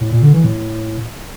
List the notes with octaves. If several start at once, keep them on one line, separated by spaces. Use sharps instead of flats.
A2
A#2
D3
E3
A2